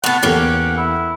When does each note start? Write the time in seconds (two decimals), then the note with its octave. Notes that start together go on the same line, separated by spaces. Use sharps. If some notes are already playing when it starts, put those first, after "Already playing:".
0.04 A2 B3 F#5
0.23 E2 E3 A#3 C#4 G4 A4
0.78 E4